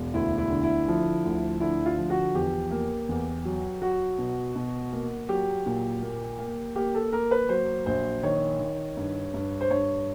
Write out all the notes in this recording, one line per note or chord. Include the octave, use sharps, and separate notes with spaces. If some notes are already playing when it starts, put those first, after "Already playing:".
Already playing: E1
D2 E4
E4
D3
E4
F3
D2
D3 E4
F4
F3
F#4
E2 G4
A#3
E2
F#3
F#3 F#4
B2
B2
A#3
F#3 G4
A#2
A#3
A#3
A#3 G4
A4
A#3 A#4
B4
F#3 C5
A#1 C5
D#3 C#5
D#3
G2
G2
C5
G2 C#5